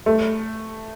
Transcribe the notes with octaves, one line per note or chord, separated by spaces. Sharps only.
A3